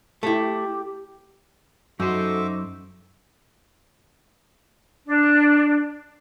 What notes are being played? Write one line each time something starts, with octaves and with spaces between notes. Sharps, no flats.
A3 E4 G4
F#2 D#4 F#4 A4 C5 E5 C#6 D6
D4